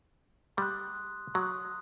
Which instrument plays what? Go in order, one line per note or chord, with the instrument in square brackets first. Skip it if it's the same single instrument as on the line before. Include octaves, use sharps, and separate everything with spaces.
[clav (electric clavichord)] G3 [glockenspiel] C6 D#6 F#6
[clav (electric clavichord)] F#3 [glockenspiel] C6 D#6 F#6